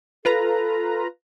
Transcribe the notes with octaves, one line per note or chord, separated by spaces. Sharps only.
F4 A4 B4 A#5